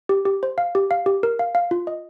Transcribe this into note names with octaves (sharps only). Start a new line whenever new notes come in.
G4
G4
C5
F5
G4
F5
G4
A#4
F5
F5
F4
D#5